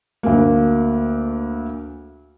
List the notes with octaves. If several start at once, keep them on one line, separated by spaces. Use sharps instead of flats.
D2 A#3